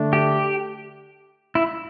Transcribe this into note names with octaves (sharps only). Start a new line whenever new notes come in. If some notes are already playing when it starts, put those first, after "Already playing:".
Already playing: D3 A3 D4
G4
E4